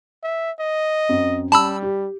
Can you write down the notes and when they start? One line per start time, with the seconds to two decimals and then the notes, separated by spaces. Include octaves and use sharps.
0.23 E5
0.59 D#5
1.09 F#2 C4
1.52 G3 C#4 A5 B5 E6
1.83 G4